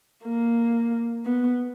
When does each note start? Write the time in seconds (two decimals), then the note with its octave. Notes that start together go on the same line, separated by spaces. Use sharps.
0.24 A#3
1.25 B3